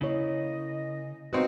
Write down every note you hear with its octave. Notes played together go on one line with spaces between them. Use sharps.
C#3 A#3 E4 C#5 D#5
B3 C4 D#4 F#4 A#4 F5